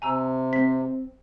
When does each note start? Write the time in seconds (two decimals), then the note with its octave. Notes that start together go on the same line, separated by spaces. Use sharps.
0.02 C3 G#5 A#5 E6
0.53 C4 B6